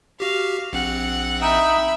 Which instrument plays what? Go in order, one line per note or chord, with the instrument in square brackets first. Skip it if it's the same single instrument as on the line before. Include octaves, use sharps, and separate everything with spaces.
[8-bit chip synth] F#4 G4 [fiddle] F5
[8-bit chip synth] A#1 C4 F#6 [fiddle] F#5
[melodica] D#4 G5 D#6 [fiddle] E5 B5